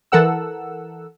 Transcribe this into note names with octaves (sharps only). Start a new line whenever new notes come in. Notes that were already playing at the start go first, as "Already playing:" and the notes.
E3 A4 A#4 F#5 E6